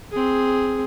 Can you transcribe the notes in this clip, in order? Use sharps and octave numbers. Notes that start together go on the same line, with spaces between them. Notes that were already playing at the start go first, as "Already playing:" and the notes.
C4 G#4